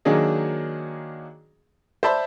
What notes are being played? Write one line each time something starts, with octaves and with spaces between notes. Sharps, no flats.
D#3 F#3 A#3 D4 G#4 D#5
C5 D5 E5 A5 B5 C6